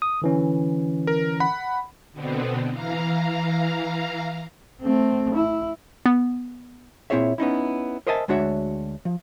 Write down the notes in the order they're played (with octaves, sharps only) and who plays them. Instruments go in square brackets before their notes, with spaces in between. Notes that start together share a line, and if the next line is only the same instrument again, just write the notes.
[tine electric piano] D#6
D3 E3 C#4
[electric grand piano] A#4
F#5 B5
[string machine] B2 D3 B3 C4
E3 F5 A#5
[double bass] A3 C4
E4
[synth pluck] B3
[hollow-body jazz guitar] A#2 C4 E4 G#4 C#5 E5
B3 C#4 D#4 E4
A#4 C5 D#5 E5 G#5 A5
D2 G#3 D4 F#4 C#5 E5
F3